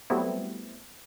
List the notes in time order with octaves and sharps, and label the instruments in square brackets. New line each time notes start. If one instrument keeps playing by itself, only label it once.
[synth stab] F#3 G3 A3 B3 C4 E4